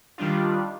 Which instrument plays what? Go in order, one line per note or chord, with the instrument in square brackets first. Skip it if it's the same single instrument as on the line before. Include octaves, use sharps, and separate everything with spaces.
[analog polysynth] D#3 G3 D4 F4